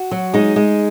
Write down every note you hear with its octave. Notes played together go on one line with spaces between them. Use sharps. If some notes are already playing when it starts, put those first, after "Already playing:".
Already playing: F#4
F#3
G#3 D#4
G#3